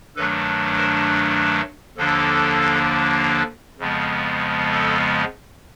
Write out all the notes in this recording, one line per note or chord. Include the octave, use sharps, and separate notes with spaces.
G2 D#3 F#3 A3 D4 A4 B4
A#4 C5
D#2 D3 F3 A#3 D4 A4
F2 C#3 F3 G#3 B3
A4